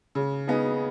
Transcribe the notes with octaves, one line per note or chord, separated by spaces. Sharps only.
C#3
B3 D#4 G#4